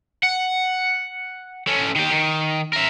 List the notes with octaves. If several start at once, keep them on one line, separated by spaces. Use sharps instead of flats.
F#5
A3 C#4
D#3 G4
D#3
A#4 E5